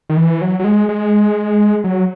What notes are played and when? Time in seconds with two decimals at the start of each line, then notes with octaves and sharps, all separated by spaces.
0.09 D#3
0.17 E3
0.41 F#3
0.59 F#3
0.64 G#3
0.89 G#3
1.84 F#3